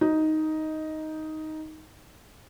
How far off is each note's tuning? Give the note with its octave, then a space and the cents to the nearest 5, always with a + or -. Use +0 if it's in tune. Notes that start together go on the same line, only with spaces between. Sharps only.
D#4 +5